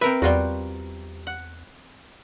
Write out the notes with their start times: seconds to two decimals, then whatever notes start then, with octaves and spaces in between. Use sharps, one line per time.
0.01 C4 A#4 B4 E5
0.22 E2 G3 F4 F#4
1.27 F#5